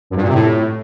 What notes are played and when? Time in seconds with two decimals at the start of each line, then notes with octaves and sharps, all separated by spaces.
0.10 F#2
0.16 G2
0.22 A#2
0.28 C3
0.34 A2